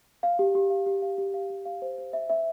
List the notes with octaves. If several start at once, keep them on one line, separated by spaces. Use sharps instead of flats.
F5
G4
G4
F5
G4
F5
G4
F5
G4
F5
C5
C5
E5
E5